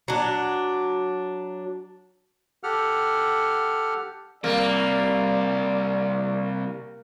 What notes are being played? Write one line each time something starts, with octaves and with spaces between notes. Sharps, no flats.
F#3 D4
G4 A4 F#5 F6
C3 G3 A#3 D5